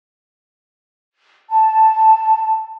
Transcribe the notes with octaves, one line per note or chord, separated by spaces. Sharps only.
A5